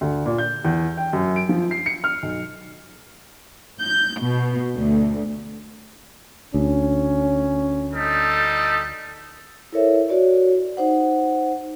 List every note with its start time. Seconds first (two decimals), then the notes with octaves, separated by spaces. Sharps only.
0.01 D2
0.26 A#2
0.38 G6
0.65 E2
0.97 G5
1.13 F#2
1.36 D7
1.49 F3
1.71 C7
1.86 C#7
2.04 F6
2.23 B1
3.78 G6
4.20 B2
4.76 D2
6.54 D2 C#4
7.92 G3 D#4 A4
9.73 E4 A4 A#4 C5 C#5 E5
10.09 F#4 C#5 D5
10.77 D#4 C5 F#5